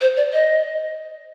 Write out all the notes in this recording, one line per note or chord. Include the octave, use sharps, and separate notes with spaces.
C5
D5
D#5